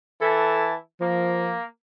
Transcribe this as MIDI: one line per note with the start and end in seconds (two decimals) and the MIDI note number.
0.21 0.74 52
0.21 0.74 64
0.21 0.70 69
0.21 0.74 81
1.01 1.57 53
1.01 1.62 58